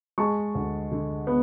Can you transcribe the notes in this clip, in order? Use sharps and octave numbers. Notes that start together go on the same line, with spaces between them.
G#3 A5 C#6
D2
D3
B3